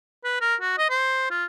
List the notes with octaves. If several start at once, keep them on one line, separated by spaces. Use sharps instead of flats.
B4
A#4
F#4
D#5
C5
F4